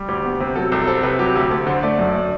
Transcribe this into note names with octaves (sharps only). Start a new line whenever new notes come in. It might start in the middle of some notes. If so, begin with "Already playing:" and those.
Already playing: G3
D2 G4
B3
C3
F#3 A4
C2 A4
C4 A4
C3 B4
F#3 G4
D2 G4
D2 A4
D3 C5
A3 D5
F#2
D4